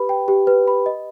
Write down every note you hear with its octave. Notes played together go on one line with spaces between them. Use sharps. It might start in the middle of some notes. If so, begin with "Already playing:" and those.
Already playing: G4 B4 B5
G5
G4
B4
B5
D#5